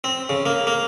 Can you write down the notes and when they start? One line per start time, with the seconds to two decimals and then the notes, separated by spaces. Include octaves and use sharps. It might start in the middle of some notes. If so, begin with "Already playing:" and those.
0.04 C4
0.29 C#3
0.46 A#3
0.67 A#3